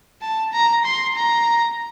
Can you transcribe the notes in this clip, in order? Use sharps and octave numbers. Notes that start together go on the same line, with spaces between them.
A5
A#5
C6
A#5